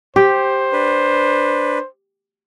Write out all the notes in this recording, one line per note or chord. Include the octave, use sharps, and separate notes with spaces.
G4 C5
D4 B4